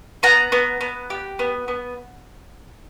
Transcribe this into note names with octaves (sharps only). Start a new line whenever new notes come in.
B3 F#5 A#5
B3
B3
G4
B3
B3